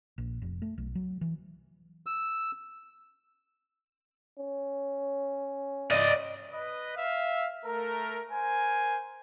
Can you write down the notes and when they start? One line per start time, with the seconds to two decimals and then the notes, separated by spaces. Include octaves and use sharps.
0.18 A#1
0.42 F1
0.62 A3
0.78 B1
0.95 F#3
1.21 E3
2.06 E6
4.38 C#4
5.91 D5 D#5
6.52 B4 D#5
6.97 E5 F5
7.65 A3 A#4
8.31 A#4 C5 G#5